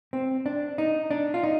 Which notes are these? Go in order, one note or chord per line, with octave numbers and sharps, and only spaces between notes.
C4
D4
D#4
D4
F4
D#4